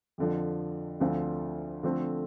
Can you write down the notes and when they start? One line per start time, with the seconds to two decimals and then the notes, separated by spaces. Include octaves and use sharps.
0.18 F2 D3 F3
1.00 D2 D3 F3 C4 F4
1.83 D3 F3 A3 C4